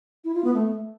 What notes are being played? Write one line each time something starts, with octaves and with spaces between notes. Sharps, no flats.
E4
F4
B3
A3